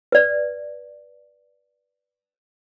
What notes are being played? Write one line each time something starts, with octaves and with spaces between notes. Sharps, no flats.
B4 D5